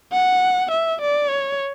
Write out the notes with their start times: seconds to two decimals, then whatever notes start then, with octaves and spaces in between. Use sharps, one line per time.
0.12 F#5
0.71 E5
1.01 D5
1.30 C#5